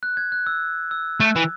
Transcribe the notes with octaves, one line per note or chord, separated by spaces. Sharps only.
F#6
G#6
F#6
E6
E6
A3
E3